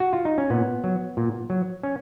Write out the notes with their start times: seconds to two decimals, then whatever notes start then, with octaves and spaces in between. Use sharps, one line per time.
0.00 F#4
0.13 F4
0.25 D#4
0.38 C#4
0.50 A#2 B3
0.84 F#3
1.17 A#2
1.50 F#3
1.83 C#4